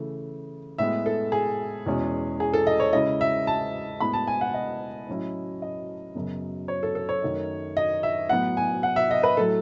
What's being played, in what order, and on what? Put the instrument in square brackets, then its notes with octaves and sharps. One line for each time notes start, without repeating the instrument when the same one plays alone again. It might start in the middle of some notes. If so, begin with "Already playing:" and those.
Already playing: [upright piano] C#3 E3 A3
A2 G#3 B3 E5
A4
G#4
E2 B2 G#3 C#4
G#4
A4
D#5
C#5
C#3 G#3 C#4 E4 D#5
E5
A5
A2 G#3 B3 E4 B5
A5
G#5
F#5
D#5
A2 F#3 C#4 E4
D#5
F#2 C#3 F#3 B3
C#5
A4
A4
C#5
F#2 D#3 A3 D#4
D#5
E5
A2 F#3 B3 F#5
G#5
F#5
E5
D#5
B4
A2 F#3 A3 A4